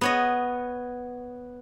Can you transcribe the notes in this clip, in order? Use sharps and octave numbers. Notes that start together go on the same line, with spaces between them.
B3 C#5 D#5